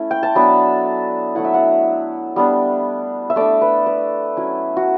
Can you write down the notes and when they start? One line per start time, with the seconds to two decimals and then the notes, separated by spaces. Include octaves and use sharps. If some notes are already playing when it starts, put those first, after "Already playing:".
Already playing: A3 C#4 E4
0.11 G5
0.23 A5
0.35 F#3 B3 D4 B5
1.35 F#3 A3 E4 F#5
1.45 E5
1.54 F#5
2.36 G3 B3 D4
3.30 E5
3.36 A3 D4 D5
3.61 B4
3.86 B4
4.37 F#3 C#4 E4
4.77 F#4